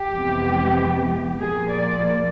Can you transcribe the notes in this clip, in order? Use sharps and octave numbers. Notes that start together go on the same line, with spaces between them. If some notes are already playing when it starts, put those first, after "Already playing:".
Already playing: G4
F2 C3 E3 G#3 B3
A#2 F3 A#3 G#4
D5